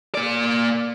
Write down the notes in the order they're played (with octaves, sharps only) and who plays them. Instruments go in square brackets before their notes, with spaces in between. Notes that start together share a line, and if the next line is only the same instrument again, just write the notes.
[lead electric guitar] A#3 D5